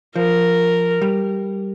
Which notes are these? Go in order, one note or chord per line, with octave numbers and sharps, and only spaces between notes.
F3 A#4
G3